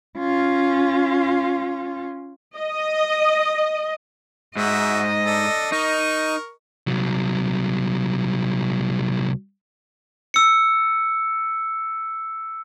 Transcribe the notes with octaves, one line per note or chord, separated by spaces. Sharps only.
C#4 F4
D#5
G#2 F#4 D#5 E5
D4 A4
D#4 A#4 C#6
C2 F#3
E6 C#7